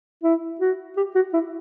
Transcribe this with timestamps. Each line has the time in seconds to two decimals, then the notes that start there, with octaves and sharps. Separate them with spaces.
0.23 E4
0.60 F#4
0.97 G4
1.15 F#4
1.33 E4